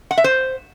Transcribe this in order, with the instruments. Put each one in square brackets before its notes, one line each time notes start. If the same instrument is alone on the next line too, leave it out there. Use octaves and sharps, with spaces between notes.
[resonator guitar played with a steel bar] F#5
E5
C5